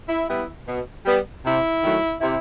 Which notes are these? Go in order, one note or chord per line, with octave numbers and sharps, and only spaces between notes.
E4
G3 B3 E4
B2
G3 B3
C3 E4
D#3 F#3 A3
C3 E4